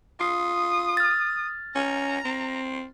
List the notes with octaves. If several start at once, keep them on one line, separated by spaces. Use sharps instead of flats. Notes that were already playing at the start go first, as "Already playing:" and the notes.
F4 D#6
F6 A6
C#4 A#5
C4